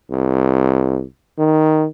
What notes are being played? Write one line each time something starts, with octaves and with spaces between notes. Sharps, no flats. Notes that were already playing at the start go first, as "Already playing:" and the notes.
C2
D#3